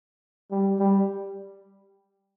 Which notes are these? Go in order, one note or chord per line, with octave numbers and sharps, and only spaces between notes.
G3
G3